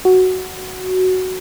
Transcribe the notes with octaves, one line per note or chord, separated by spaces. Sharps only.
F#4